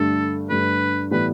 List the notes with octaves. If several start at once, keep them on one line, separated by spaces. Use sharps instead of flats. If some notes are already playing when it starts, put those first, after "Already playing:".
Already playing: G2 D3 A3 A4
G2 D3 A3 B4
A2 E3 G3 B3 B4